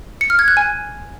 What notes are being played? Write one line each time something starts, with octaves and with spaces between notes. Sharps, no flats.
C#7
F6
G#6
F#6
G#5